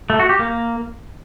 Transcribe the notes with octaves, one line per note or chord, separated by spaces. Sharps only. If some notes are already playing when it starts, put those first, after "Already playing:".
A3
F#4
G4
A#3